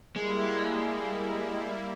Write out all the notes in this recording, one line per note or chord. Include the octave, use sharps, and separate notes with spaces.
G3 G#3 A#3 E4